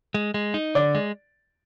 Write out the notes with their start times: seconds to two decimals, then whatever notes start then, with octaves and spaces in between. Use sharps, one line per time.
0.14 G#3
0.34 G#3
0.54 D#4
0.75 D3 D5
0.95 G#3